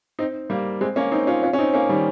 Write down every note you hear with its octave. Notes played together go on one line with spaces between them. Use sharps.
C4 D#4
G3 A#3
G#3 C4
A#3 C#4
C4 D#4
C#4 F4
C#4 F4
C#4
C4 D#4
A#3 C#4
D#3 G3